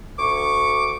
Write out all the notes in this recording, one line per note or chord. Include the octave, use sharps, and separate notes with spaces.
D2 C#6 D6